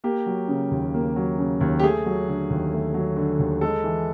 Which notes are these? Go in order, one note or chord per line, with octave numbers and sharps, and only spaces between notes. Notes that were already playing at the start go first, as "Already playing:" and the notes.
A#3 G4
F#3
C#3
D#2
A#3
F#3
C#3
D#2
G4
A3 G#4
F#3
D3
D#2
A3
F#3
D3
D#2
G#3 A4
E3